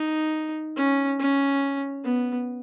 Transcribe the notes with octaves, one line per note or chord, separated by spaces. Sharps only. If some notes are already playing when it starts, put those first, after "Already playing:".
Already playing: D#4
C#4
C#4
B3